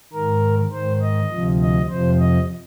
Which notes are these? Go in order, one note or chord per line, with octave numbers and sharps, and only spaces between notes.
G#2 D#3 A#4
G#2 D#3 C5
D#5
D2 C3 F3
D#5
F2 C3 F3 C5
D#5